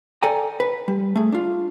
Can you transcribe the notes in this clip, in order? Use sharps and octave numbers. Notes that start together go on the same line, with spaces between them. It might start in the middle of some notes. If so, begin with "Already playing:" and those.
A4 D5 G5 G#5 A#5
B4
G3
A3 G#4
D4 F4